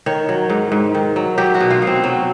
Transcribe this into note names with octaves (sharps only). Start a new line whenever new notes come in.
D#3 C#5
F#3
G#2
G#2
D#3
F#3
F#3 G4
F#4
B2
F4
B2
C4
F#3